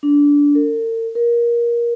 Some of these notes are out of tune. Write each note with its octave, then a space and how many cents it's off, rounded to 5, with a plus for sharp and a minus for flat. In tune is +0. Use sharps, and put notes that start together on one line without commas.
D4 -20
A#4 -45
A#4 +20